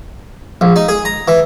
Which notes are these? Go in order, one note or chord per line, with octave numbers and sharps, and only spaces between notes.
A#1
D#4
G#4
A#5
E3